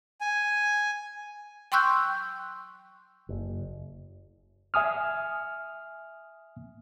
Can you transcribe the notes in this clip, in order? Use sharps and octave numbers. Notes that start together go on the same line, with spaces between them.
G#5
G5 C6 C#6 E6 F#6 G6
F#1
E5 G#5 D#6 F6